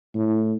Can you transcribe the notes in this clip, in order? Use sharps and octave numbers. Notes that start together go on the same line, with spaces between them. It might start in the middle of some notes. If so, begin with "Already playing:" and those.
A2